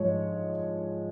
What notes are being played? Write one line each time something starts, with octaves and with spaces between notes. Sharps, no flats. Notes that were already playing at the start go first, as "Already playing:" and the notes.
Already playing: G#2 F3 G#3 C#5